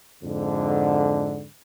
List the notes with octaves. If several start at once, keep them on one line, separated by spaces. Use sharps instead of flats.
F2 G#2 D3